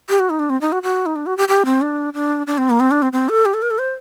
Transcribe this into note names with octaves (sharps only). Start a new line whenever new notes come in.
G4
F#4
D#4
D4
C4
D#4
F#4
F#4
D#4
D4
F#4
G4
G4
C4
D4
D4
D4
C4
A#3
C4
D4
C4
C4
A4
G4
A4
A#4
A4
C5